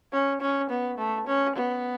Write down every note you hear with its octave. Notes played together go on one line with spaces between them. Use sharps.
C#4
C#4
B3
A3
C#4
B3